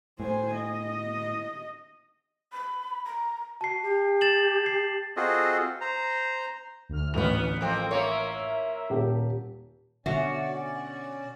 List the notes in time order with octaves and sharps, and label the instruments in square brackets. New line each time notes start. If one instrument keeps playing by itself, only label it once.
[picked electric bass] A2 [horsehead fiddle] C5 G#5
[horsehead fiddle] D#5
[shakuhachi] B5
A#5
[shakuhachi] F#4 [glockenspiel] A5 C7
[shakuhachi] G4
[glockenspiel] A6 E7 F#7
C7
[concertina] C4 F4 F#4 G#4 A4 D#5
C5 A#5
[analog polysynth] D2 F6
[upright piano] A1 F7 [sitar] A#2 B3
[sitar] F2 A#3 C4
[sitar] A#3 C#5 [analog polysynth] A#4 E5
[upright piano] D#1 G4
[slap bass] B2 D3 [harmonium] C#4 D5 [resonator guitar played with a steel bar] F#4 [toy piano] E5